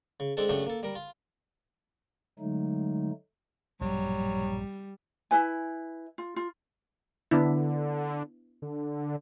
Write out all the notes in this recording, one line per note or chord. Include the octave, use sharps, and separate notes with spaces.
C#3
G#3 C4 D4 G#4 A4
F#2 C#3 A3 D4 G4
A#3 A4
G3 A#4
F4
D3 F#3 G#3 A3 D#4
A#1 G2 B2 F#3 G3
E4 B4 G#5
F4
F4
D3 B3 D4 E4
D3